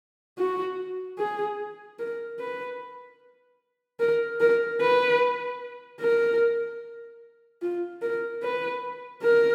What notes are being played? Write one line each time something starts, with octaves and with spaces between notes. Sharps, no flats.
F#4
G#4
A#4
B4
A#4
A#4
B4
A#4
F4
A#4
B4
A#4